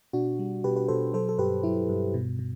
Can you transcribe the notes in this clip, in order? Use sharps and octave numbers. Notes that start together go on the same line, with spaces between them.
B2 D4 F#4
G3
B2 G4 B4
G4 B4
B2 A4 C5
F#3 A4 C5
A4
G2 G4 B4
F#3 E4
G2
B2
B2